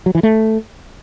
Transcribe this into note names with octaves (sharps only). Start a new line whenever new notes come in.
F#3
E3
A3